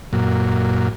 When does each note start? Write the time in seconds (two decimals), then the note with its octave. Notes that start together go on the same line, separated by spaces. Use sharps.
0.13 F#2 A#2